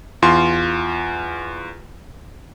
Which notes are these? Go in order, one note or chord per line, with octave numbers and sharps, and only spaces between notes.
E2 F4 C6